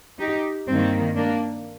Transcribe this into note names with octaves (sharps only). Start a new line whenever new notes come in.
D#4 G4
G2 D#3 A#3 C4
A#3 D4